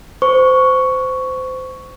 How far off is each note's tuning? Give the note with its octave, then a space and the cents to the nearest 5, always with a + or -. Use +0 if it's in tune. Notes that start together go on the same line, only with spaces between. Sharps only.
C5 -25 C#6 +5